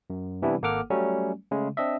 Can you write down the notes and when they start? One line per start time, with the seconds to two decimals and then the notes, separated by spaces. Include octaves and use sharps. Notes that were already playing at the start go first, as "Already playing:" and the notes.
0.10 F#2
0.42 C3 E3 G3 B3 D4 E4
0.62 G#1 A#3 A4 F#5 D6 F6
0.90 F#3 G3 A3 C#4
1.51 C#3 G#3 A3
1.77 C4 D4 D#5 E5